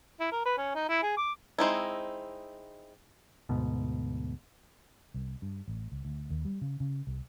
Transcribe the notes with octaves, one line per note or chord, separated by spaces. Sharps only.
E4
A#4
B4
C#4
D#4
E4
G#4
D6
G#3 C4 D#4 E4
D2 G#2 B2
C2
G2
A1
C#2
D2
D#2
G3
C#3
C#3
C2